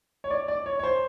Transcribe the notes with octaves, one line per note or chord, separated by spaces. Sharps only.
C#5
D5
D5
C#5
C#5
C5